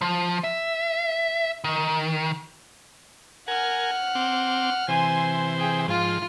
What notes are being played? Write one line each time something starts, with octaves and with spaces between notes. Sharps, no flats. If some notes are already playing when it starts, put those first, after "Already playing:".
F3
E5
D#3
A#4 F#5 G#5 F6
C4 D6
C3 E3 C5 G#5 C6
G#4 G5
G#2 F3 F4 F6